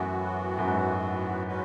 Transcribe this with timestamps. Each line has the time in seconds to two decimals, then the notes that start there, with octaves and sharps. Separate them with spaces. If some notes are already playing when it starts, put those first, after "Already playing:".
Already playing: F#2 A2 E3 B3 F#4
0.58 F#2
0.67 G#2
1.47 E3 G#3 C#4 F#4 B4